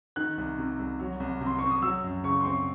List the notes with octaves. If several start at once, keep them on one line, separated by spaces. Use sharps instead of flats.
D#3 F#6
C2
C3
C2
F#3
C2
C3
C6
C4 C#6
D#6
F#3 E6
F#2
C#3 C#6
C6
C4 C#6